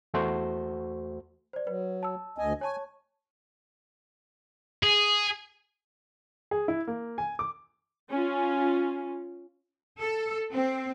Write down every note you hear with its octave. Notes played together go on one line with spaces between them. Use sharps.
E2 A3 F#4 C5
C5 D5
F#3 B4
A5 E6
D2 D#5 G#5
C#5 G#5 A5 C#6
G#4
G#4
E4
A#3
G#5
D6
C#4 F4
A4
C4